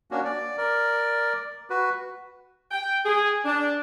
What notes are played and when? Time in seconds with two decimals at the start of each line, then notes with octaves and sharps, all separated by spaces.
0.11 A#3 C#4 D4 F#4
0.25 D5
0.58 A#4 D5
1.70 F#4 B4
2.71 G5
3.05 G#4
3.45 D4